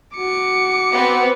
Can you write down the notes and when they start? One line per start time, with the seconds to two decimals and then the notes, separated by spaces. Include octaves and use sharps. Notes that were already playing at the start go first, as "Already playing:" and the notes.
0.17 F#4 D6 C#7
0.92 B3 C4